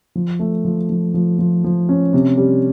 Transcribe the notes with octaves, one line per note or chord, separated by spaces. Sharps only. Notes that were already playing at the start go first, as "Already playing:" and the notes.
F3
A3
F3
F3
F3
F3
F3
C#4
C3
G3